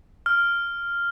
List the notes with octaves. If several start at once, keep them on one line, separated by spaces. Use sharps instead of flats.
F6